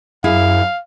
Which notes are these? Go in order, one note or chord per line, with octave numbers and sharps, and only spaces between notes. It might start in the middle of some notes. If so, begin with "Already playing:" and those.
F#2 E4 G#4 F5